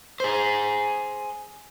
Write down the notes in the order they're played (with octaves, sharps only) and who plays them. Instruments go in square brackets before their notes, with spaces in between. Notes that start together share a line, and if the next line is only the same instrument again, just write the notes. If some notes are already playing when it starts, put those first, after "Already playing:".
[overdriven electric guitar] G#4 C5